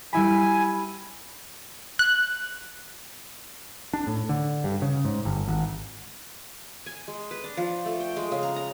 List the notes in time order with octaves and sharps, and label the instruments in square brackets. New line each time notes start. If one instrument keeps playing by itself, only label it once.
[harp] G3 E4 B5 [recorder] G#5
[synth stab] F#6
[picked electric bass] D4
A2
D3
G2
C#3
G#2
G1
G#1
[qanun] G#5
G#3
B4
D4
F3
A3
G5
G#3
C#3
A#5
A#5